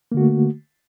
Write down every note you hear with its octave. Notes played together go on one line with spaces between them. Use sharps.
D3 A3 A#3 F#4